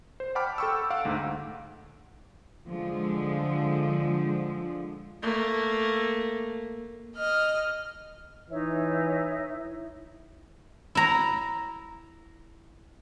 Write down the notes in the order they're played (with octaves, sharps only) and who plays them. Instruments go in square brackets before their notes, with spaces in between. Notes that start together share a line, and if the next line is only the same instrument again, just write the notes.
[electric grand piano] C5
F#5 G5 A5 B5 D6 F6
A4 G5 C#6 E6
F5 F#5 D7
D2 G#2
[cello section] D3 F3 G#3
[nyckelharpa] A3 A#3
[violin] D#5 F6
[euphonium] E3 [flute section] D#4 C#5 E5
[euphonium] E4
[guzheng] E4 A#5